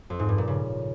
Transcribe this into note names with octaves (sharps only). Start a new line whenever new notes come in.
F2
G#2
G2
A#2
C#3